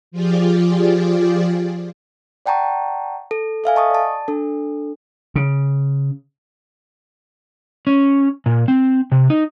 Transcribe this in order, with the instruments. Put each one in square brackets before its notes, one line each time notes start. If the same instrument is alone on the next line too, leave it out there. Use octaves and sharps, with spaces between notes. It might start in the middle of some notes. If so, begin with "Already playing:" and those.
[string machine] F3 F4 G4 G#4 D5
[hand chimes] D5 F#5 G5 A5 A#5 C#6
A4
A4 E5 F5 G#5
D#5 A5 C#6 D#6
D5 A5
D4 A4
[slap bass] C#3
[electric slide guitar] C#4
A#2
C4
C3
D#4